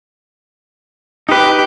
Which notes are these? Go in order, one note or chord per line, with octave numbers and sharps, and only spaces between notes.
D#4 G4 B4